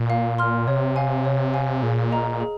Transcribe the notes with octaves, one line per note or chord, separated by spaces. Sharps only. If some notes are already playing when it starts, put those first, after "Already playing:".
Already playing: A#2
F5
C6 F6
C3 C#5
F5 G#5
C#5
F5 G#5
A#2 G#4
D#5 A#5 F6
G#4